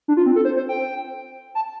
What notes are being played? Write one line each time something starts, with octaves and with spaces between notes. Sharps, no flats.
D4
F4
C4
A4
C5
C5
G5
A5